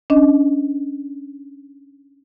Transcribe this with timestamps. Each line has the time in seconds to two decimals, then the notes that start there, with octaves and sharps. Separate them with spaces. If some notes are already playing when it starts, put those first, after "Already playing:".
0.10 C#4 D4 D#5